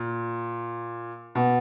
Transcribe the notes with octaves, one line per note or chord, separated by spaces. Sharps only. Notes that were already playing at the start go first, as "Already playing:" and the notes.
Already playing: A#2
B2